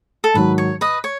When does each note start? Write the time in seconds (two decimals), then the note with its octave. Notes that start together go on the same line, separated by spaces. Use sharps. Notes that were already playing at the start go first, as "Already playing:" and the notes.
0.24 A4
0.34 G#2 D#3 F#3 B4
0.58 C#5
0.81 B4 D#5
1.04 C#5